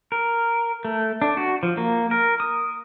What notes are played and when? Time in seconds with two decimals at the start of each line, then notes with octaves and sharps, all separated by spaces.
0.12 A#4
0.85 A3
1.22 D4
1.37 F#4
1.63 F3
1.77 A#3
2.11 A#4
2.40 D#6